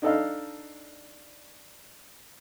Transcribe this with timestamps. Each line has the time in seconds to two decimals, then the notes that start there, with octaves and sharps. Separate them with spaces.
0.02 D4 D#4 A4 D#5 F5